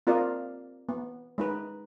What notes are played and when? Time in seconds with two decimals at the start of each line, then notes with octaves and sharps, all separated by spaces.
0.07 C4 F4 A#4 D5 D#5 F5
0.89 B3
1.38 G#3 D#4 B4